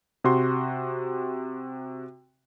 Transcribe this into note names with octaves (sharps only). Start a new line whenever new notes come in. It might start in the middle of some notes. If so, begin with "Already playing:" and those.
C3 F#4 C6